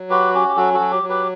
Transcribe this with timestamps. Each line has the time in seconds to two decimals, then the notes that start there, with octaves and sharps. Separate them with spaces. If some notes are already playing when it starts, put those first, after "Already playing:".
Already playing: F#3
0.10 F#4 G4 B4
0.34 C#4 G4
0.48 G4
0.56 F#3 F#4 A4
0.74 F#4 A4
0.80 F#3
0.92 G4
1.03 F#3
1.09 G4 B4